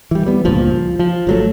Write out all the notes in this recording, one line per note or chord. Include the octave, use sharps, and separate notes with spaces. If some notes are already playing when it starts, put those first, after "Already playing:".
E3 G3
G3 B3
C#2 G2 A#2 F3
F3
F3
G1 F#3 A3